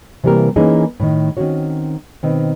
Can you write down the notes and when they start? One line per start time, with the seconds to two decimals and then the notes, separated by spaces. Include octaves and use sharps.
0.24 C3 E3 G3 A#3 G4 A#4
0.56 E3 A#3 C#4 D#4 G#4
1.00 A2 D#3
1.37 D#3 C4 C#4 F#4 C#5
2.23 B2 D#3 C4